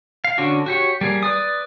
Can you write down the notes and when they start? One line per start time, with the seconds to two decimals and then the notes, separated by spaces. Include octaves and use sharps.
0.25 F5
0.38 D3 C#4 D4 F#4
0.66 F#4 G4 C#5
1.01 G3 A#3 G#4
1.23 B4 D5 D#6